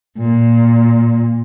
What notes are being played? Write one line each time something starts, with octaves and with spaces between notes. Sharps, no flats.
A#2